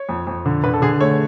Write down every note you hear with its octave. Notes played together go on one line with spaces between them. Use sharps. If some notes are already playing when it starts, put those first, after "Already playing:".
Already playing: C#5
F2
F2
D3
D3 B4
A4
D3 G#4
A3 C#5